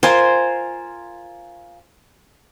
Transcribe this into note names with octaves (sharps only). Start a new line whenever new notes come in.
F4 A#4 C5 G#5